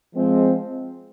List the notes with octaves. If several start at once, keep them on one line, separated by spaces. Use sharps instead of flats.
F3 G#3 C4